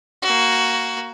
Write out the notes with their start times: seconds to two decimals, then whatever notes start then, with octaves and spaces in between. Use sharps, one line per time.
0.22 A#3 F#4